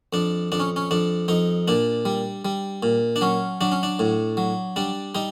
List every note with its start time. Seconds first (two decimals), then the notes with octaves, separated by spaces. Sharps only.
0.13 F2 D4
0.52 F2 D4
0.60 C#4
0.76 C#4
0.91 F2 D4
1.28 F2 D#4
1.68 A#2 D4
2.05 G3
2.45 G3
2.83 A#2
3.16 D4
3.21 F#3 C#4
3.61 F#3 D4
3.72 C#4
3.83 D4
3.99 A2
4.37 F#3
4.76 G3 D4
5.15 G3 D#4